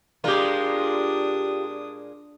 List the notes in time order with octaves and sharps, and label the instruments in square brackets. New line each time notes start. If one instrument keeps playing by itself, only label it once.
[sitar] A#2 G#3 A#4 [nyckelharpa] D4 D#6 [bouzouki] F4 G4